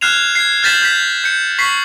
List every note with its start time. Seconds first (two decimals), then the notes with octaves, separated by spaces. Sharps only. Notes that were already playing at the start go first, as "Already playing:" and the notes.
0.01 F6 F#6 G#6 C7 E7 F7
0.35 G#6 C7
0.63 F6 G6 A6 B6 E7 F#7
0.82 G6 B6
1.24 G6 C#7
1.59 C#6 B6 C7 F#7